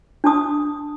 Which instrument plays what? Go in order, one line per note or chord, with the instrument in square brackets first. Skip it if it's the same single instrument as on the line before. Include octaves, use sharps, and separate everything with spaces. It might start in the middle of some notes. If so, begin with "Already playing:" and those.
[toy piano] D4 A5 D#6